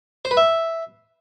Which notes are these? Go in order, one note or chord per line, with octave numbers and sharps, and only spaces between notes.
C5
B4
E5